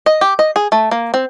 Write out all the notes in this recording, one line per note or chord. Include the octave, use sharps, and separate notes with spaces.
D#5
G4
D#5
G#4
A3
A#3
C4